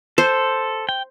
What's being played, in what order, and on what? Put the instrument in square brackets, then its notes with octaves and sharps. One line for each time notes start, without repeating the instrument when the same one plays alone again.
[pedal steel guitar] A4 [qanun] C5
[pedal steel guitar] G5